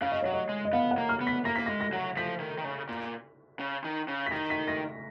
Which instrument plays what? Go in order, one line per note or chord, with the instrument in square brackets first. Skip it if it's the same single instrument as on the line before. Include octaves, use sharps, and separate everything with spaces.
[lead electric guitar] C#3 [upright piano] F5
[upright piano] D#5
[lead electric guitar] F#3 [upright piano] C#5
[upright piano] D#5
[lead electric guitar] G#3
[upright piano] D#5
[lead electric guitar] B3 [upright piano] F5
[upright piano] F#5
[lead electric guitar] A#3
[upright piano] F6
[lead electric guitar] B3
[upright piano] B6
[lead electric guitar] A#3 [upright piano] A#6
[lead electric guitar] A#3 [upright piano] B6
[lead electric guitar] G#3 [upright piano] A#6
[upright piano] A#6
[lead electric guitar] F#3
[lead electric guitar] F3 [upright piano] B6
[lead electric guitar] D#3
D#3
C#3
A#2
C#3
D#3
C#3
[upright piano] B6
[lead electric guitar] D#3 [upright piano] A#6
[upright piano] B6
A#6